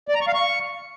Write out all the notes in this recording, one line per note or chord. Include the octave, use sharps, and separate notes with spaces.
D5
A#5
C#6
F5
C#6